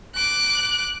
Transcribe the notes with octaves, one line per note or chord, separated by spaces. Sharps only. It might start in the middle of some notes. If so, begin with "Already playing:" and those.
D6 F#6